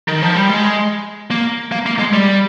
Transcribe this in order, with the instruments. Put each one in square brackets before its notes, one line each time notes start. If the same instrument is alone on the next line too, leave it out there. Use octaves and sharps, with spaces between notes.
[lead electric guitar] D#3
F3
G3
G#3
A#3
A#3
A#3
G#3
G3